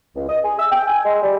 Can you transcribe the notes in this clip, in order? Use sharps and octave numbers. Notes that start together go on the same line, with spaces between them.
C#2
D#5
G#4
E6
G5
G#5
G#3
G3